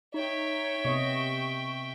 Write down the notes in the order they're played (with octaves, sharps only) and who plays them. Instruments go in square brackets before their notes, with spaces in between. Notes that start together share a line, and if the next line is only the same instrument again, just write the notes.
[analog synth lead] D#4 [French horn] C#5 [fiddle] E5 G5
[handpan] C3 B3 D#5 [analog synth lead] C#6